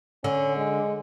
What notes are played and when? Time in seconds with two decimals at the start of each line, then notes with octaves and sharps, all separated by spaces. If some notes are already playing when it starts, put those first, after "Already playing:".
0.24 D3 C#4
0.57 G#3